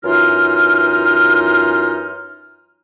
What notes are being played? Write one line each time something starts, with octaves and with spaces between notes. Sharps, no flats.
F#2 E3 D#4 F4 F6